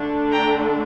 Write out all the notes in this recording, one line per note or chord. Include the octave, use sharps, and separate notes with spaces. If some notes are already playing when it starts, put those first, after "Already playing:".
Already playing: D3 A3 D4
G5 A#5